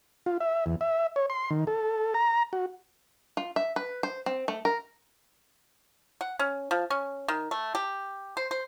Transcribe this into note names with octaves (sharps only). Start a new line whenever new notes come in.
F4
E5
E2
E5
C#5
C6
D#3
A4
A#5
F#4
F4
E5
B4
C5
C4
A3
A#4
F#5
C#4
F3
C#4
D#3
A3
G4
C5
C5